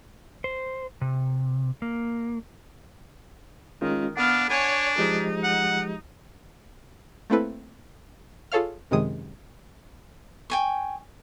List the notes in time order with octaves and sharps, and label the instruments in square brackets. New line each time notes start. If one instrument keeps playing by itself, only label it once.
[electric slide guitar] C5
C3
A#3
[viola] D#3 [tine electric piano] G#3 C#4 F4
[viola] B3 F5 [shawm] D4 [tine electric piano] F#5
[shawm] D4 [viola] C#5 G#5
[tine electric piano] F3 G#3 G4 [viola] D#4
[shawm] F#5
[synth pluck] A3 A#3 C4 E4 A4 B4
F4 G#4 A4 C#5 F5 F6
F#2 C3 D#3 G#3 D#6
[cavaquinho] G5 G#5 C#6